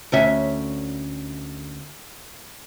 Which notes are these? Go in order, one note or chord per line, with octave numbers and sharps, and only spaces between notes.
D2 C#4 E5